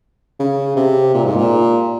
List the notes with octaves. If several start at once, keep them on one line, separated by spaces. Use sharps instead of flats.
C#3
C3
A#2
G#2
A#2